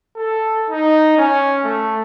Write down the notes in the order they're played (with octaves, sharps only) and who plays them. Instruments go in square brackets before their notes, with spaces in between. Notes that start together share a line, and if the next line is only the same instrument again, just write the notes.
[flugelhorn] A4
D#4
C#4
A3